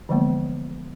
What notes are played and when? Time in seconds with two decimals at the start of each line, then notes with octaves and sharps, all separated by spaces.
0.09 D3 E3 F3 G#3 A#3 B3